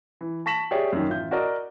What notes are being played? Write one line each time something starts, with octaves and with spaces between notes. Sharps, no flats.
E3
A5 C#6 A#6 B6 E7 F#7
G4 G#4 C#5 D5 E5
F#2 D#3
A1 F4 E5 G6
F#4 A#4 D5 D#5